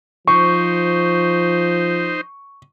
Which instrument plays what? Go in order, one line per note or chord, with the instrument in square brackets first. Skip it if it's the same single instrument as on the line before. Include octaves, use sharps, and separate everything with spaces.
[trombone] F3 [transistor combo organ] D#4 C5 [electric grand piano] C#6